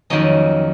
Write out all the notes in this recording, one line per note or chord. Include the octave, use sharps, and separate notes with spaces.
F2 D#3 F#3 A#3 C#4 D#5